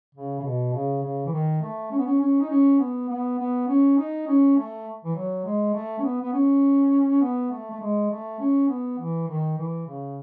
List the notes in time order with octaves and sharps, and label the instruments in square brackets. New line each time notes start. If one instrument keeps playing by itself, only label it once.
[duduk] C#3
C#3
B2
C#3
C#3
E3
D#3
A3
C#4
B3
C#4
C#4
D#4
C#4
B3
B3
B3
C#4
D#4
C#4
A3
E3
F#3
G#3
A3
C#4
B3
B3
C#4
B3
A3
A3
G#3
A3
C#4
B3
E3
D#3
E3
C#3